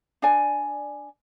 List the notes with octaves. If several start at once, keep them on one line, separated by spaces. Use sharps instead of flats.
D4 D5 G#5